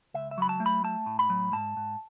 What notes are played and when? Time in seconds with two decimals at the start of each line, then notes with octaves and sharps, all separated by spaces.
0.14 C#2 E5
0.31 E5
0.38 F#3 B5
0.49 A5
0.60 A3
0.66 B5
0.84 A3 A5
1.06 A2
1.19 B5
1.30 F#3
1.52 G#2 A5
1.77 G#2